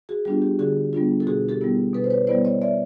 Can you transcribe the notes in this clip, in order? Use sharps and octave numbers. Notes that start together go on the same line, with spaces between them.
F#4 G#4
G3 B3 D4 F4 G4
G4
D3 F#4 G#4
G3 B3 D4 F4
A4
B2 F#4 G#4
G4 A4
G3 B3 E4
B2 A4 B4
C5
B4 C#5
G3 B3 E4 C5 D5
C#5 D#5
D5 E5